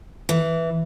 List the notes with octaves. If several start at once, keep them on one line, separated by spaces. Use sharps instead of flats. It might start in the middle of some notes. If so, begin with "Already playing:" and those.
E3